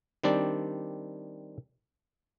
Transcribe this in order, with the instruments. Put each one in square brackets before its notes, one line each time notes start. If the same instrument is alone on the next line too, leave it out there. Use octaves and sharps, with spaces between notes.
[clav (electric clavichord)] D#3 G3 C4 D4 D5